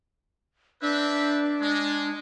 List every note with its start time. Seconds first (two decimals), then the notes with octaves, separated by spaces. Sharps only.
0.82 C4 D4 B4 E5
1.62 G#3